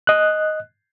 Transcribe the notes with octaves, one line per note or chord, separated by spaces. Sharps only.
D#5 F#6